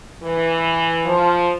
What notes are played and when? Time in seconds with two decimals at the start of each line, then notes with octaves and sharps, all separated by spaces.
0.23 E3
1.05 F3